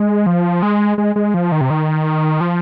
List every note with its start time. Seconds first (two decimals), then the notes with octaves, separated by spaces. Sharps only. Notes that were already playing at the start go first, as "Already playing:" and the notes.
Already playing: G#3
0.26 F3
0.63 G#3
0.98 G#3
1.16 G#3
1.34 F3
1.52 D#3
1.61 C3
1.70 D#3
2.41 F3